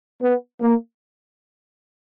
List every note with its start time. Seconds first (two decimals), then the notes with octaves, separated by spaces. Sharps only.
0.22 B3
0.62 A#3